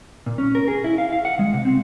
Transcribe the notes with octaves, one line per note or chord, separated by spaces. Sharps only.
A#2
C#4
A#4
G#4
E4
F5
F5
F#5
G#3
C3
C4